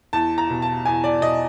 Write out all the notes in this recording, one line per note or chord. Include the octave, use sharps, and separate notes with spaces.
E2 A5
A#5
B2
A5
E2 G#5
D5
B2 D#5